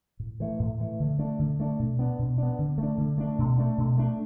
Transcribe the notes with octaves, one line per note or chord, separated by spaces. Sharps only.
A2
E3 A3
A2
E3 A3
D3
A3 D4
D3
A3 D4
B2
B3 D4
B2
B3 D4
D3
A3
D4
D3
A3 D4
B2
A3 D4
B2
A3 D4